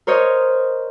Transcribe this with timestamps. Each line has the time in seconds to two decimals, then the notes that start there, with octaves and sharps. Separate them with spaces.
0.07 A#4 C5 C#5 D#5